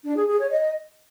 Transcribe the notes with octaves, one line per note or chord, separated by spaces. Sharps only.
D4
G#4
G#4
C#5
D#5